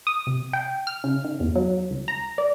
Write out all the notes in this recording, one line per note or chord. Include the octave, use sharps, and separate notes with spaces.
D#6
C3
G5
F6
C#3
D#3
E2
F#3
C#2
A#5
D5